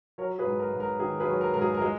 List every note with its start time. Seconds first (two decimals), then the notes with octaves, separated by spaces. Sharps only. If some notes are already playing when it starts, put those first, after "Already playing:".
0.18 F#3 A#4 C#5
0.39 G#4 B4
0.46 G#2
0.59 A#4
0.73 G#2
0.80 A#4
1.00 D#3 G#4
1.20 G#4 B4
1.28 F#3
1.41 A#4
1.54 G#2 A#4
1.61 G#4
1.74 A#4
1.81 G#3 G#4